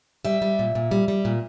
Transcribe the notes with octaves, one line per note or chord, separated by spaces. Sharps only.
G3 E5
G3
A#2
A#2
G3
G3
A#2